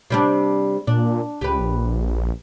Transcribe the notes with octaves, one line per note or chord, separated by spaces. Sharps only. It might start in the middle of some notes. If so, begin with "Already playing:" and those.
C3 G3 D4
A#2 D4
C#2 G4 B4
A#1